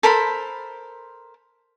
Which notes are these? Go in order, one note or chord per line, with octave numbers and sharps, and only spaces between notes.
A4 A#4 C5 B5